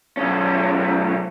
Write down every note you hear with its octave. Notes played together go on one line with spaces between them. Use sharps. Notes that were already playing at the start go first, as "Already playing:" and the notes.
B1 C#4